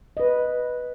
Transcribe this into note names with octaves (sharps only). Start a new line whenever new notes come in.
B4 D#5